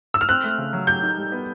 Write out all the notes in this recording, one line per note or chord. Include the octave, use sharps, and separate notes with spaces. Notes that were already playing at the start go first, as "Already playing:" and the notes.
E6
F6
C4 F#6
A3
C#3
F#3
G4 G6
D#4
G3
B3